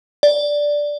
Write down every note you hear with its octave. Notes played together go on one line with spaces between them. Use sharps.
D5